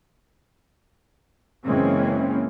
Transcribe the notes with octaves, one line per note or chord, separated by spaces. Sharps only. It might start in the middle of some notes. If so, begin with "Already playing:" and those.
F#1 E3 G#3 A#3 C4 C#4